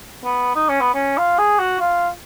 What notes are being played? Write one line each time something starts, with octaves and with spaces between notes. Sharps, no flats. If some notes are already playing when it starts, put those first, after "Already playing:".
B3
D#4
C#4
B3
C#4
F4
G#4
F#4
F4